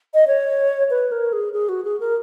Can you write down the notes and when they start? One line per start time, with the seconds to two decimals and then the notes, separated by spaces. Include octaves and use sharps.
0.14 D#5
0.27 C#5
0.90 B4
1.12 A#4
1.33 G#4
1.53 G#4
1.69 F#4
1.85 G#4
2.00 A#4